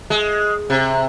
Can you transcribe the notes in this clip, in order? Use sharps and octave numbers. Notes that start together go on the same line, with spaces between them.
G#3
C3